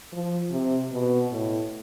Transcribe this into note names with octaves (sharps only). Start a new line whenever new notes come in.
F3
C3
B2
A2